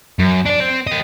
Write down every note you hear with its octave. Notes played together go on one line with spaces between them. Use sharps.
F#2
D4 D5
C4
G4 D#5